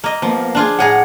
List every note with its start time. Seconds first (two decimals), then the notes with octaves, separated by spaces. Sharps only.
0.04 A#3 D#5
0.22 F3 A#3 B3
0.55 D4 F4 G#4
0.79 A2 G#4 F#5 A#5